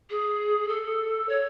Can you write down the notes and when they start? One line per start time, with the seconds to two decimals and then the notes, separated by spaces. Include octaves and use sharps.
0.10 G#4
0.68 A4
1.29 C#5